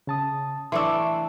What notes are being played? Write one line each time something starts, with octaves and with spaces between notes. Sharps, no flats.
C#3 A5 D#6
E3 A3 D4 C6 C#6 E6